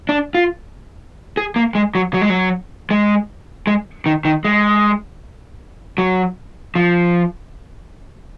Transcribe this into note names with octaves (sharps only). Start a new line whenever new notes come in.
D4
F4
G#4
A#3
G#3
F#3
F#3
G#3
F#3
G#3
G#3
D#3
D#3
G#3
F#3
F3